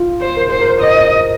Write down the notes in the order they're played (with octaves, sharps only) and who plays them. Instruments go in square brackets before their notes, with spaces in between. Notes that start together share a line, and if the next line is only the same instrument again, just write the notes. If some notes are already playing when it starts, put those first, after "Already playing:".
Already playing: [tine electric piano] F4
[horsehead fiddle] C5
[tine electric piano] A#4
[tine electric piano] G#4 [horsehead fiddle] C5
[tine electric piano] A#4
[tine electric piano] C5 [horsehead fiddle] D#5